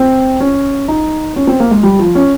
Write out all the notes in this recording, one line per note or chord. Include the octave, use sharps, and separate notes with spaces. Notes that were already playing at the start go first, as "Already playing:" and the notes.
Already playing: C4
C#4
D#4
C#4
C4
A#3
G#3
G3
F3
C#4